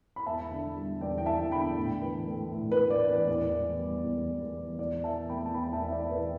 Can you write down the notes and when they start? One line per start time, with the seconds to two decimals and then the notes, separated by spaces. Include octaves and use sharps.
0.16 B5
0.26 E2 E5 A5
0.51 D3
0.76 G3
1.01 E2 D5 G5
1.18 G5
1.26 E2 E5 A5
1.51 D3 G5 B5
1.76 A2
2.02 E3
2.27 A3
2.52 A2
2.72 B4
2.77 A2
2.90 D5
3.03 E3
3.09 B4
3.27 E2 D5
3.53 E3
3.78 G3
4.04 E2
4.29 E2
4.54 E3
4.79 E2 D5
5.04 E3 E5 A5
5.29 A3 G5 B5
5.46 A5
5.54 E2 G5 B5
5.73 E5 A5
5.80 E2
5.88 E5
5.92 D5 G5
6.05 E3
6.11 B4 E5